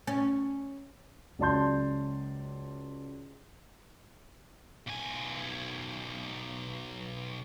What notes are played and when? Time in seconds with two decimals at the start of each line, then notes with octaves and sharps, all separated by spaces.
0.07 C#4
1.39 C#2 F#3 D5 A5 C6 G6
4.87 B1 G#5